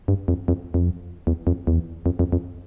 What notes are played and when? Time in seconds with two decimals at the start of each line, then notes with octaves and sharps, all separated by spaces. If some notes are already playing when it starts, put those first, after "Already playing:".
0.08 G2
0.28 F2
0.48 F2
0.74 F2
1.27 E2
1.47 F2
1.67 E2
2.06 F2
2.19 F2
2.32 F2